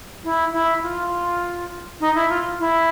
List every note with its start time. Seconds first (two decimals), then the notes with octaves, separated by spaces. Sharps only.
0.24 E4
0.53 E4
0.83 F4
2.00 D#4
2.15 E4
2.30 F4
2.60 E4